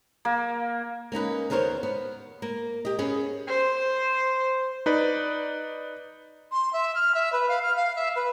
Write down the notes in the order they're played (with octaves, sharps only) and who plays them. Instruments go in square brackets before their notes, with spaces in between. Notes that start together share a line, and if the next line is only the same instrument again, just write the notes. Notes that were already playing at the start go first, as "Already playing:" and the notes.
[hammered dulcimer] A#3
[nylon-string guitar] A#3 C#4 D#4 B4
D#2 B3 A#4 C5 C#5
B3
A#3
G4 D#5
B3 C#4 G#4
[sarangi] C5
[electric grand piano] D#4 B4 D5
[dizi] C6
E5
F6
E5
B4
F5
F6
F5
E5
B4